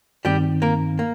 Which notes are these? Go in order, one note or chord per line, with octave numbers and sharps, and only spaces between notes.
G2 D#3 G3 C4 D#4 G4
A#3 A#4
A#3